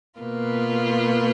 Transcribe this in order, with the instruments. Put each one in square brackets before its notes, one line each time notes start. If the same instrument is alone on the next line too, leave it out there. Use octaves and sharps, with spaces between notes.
[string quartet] B2 A#3 F4 B4